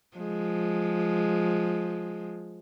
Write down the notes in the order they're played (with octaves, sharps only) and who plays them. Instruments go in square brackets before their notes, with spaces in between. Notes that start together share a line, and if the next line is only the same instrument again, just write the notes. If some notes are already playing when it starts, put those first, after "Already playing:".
[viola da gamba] F3 G#3